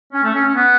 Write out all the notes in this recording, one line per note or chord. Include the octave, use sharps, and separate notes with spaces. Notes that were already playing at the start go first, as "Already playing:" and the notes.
C#4
A3
C#4
C#4
B3